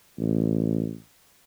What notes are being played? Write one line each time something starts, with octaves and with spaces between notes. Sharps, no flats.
A1